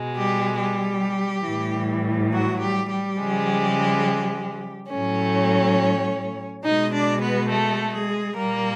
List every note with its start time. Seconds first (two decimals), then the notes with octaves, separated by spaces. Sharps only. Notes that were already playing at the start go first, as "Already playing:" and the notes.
Already playing: B2 G#3
0.16 G3 G4
0.59 G3 G4
1.44 A2 E3 G3
2.32 F#3 F#4
2.60 G3 G4
2.89 G3 G4
3.19 C#3 F3 G#3
4.91 A2 F#3 A3 C#4 C#5
6.64 B2 G#3 D#4 D#5
6.93 D4 D5
7.22 B3 B4
7.50 A3 A4
7.94 G#3 G#4
8.37 A#2 G3 A#3 A#4